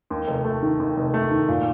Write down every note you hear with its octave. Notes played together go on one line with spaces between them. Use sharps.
D#2
F1
A3
D#3
D#2
F1
A3
D#3
A#2